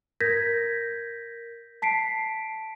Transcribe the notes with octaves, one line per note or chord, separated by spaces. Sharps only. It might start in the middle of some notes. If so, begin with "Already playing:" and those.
A#4 G6 G#6 A#6 B6
A5 B6 C7 D7